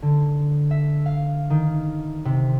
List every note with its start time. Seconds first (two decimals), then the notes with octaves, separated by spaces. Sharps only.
0.02 D3
0.71 E5
1.06 F5
1.50 D#3
2.25 C3